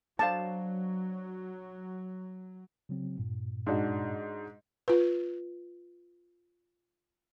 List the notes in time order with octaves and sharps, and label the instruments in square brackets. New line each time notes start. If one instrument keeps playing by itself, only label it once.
[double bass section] F#3 [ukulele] D4 C5 F5 [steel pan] A5
[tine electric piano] C#3 F#3 C4
G2 A#2
[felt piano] G#2 D4 F#4
[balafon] F4 B4